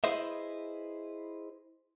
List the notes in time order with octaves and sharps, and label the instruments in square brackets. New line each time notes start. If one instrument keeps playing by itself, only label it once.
[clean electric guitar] E4 G#4 B4 C5 D#5 E5